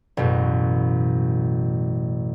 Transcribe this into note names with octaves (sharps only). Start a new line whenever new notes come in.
A1 F#2 B2 E3